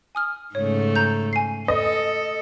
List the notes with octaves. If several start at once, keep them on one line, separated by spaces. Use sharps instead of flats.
G#5 D#6 F6
G#2 C#3 A3 C#5
A#5 G6
G#5 C7
A4 D#5